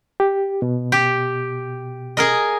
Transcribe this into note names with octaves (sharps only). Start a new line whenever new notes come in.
G4
B2
G4
G#4 A#4 D#5